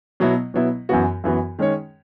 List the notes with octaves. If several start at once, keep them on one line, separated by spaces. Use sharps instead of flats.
B2 F#3 B3 E4
B2 F#3 B3 E4
F#2 E3 B3 F#4
F#2 E3 B3 F#4
D#3 G#3 C#4 G#4 C#5